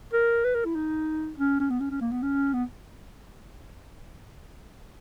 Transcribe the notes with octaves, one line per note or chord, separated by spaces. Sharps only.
A#4
B4
A#4
E4
D#4
C#4
C#4
B3
C#4
C#4
A#3
B3
C#4
B3